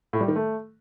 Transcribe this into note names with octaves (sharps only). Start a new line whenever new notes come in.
A2
G3
D#3
A3